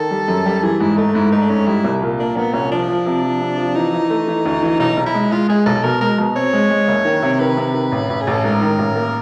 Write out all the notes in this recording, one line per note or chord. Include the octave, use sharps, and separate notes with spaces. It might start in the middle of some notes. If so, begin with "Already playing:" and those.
Already playing: D#3 A4
G3
F#2
G3
E3 G#4
G#2 E4
A3 D#4
G#2 E4
A3 D#4
D4
G#2 C#4
G3 E4
C2
A#2
A#3 D4
A#2 B3
C2 C#4
F3 D4
F3
C3
F3
C3
F3
E3 D#4
E3
A3
E3
D2
E3
B1 D#4
B1
E4
G#3
G#3 F4
G#3 G#4
B1 A4
B2 A#4
G#3 A#4
B2
C4 C#5
G#3
G#3
F#1
D#3
C3
D#3 B4
C3
D#3
A1
A1
G#4
A1 A4
G#2 A#4
D#3
A1
A#3